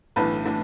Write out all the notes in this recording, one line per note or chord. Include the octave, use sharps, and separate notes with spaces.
B1 A2 E3 D4 B4
A2 E3 D4